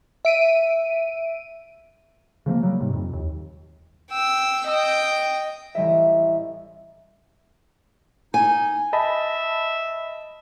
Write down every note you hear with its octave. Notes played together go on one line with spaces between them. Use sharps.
E5 D7 D#7
C#3 F3 A3 A#3
F#3 G3
G#2 C3
F2
D#2
G5 E6
D#5 G5
A1 G3 D#5 E5
D#4 G#5
D#5 E5 A5 B5